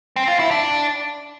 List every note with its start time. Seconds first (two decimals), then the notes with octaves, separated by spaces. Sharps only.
0.16 C4
0.28 F4
0.39 E4
0.51 D4